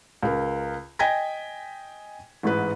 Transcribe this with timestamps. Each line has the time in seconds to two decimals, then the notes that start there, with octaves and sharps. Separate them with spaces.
0.23 C#2 A#4
0.99 D#5 G5 G#5 G#6 A#6 B6
2.43 A1 G#2 B4